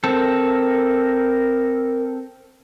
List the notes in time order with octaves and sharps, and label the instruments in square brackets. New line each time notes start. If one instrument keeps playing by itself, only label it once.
[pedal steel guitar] C4 A4 [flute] A#4